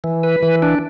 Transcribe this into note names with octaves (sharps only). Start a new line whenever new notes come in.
E3
B4
E3
D4